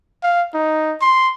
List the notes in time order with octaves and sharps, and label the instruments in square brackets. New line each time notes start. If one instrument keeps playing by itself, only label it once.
[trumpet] F5
D#4
C6